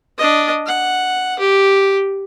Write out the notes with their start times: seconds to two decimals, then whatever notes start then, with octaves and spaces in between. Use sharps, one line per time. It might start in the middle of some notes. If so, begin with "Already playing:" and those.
0.18 D4 D#5
0.67 F#5
1.39 G4